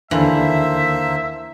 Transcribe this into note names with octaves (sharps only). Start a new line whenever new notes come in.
D#2 D3 E3 A#3 C5 E5 A5